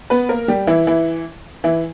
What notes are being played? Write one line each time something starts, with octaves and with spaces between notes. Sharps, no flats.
B3 B4
A#3 A#4
G3 G4
E3 E4
E3 E4
E3 E4